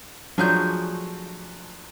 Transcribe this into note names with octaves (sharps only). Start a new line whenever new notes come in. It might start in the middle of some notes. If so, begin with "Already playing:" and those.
F3 F#3 A3 D4 G#4 G6